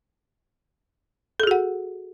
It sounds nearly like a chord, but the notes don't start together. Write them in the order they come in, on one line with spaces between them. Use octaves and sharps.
A4 G#4 F#4 F#5